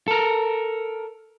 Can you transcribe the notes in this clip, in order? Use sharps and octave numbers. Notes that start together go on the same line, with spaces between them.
A4 A#4